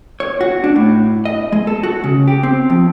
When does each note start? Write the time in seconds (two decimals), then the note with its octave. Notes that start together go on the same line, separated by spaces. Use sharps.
0.20 C#5
0.41 F#4
0.64 D4
0.76 A2
1.25 D#5
1.52 G#3
1.67 A4
1.83 F#4
2.04 C#3
2.27 G4
2.43 C4
2.70 F2